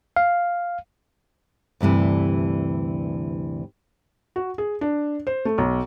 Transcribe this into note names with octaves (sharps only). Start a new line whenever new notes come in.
F5
D2 G2 C3 E3
F#4
G#4
D4
C5
A3
B1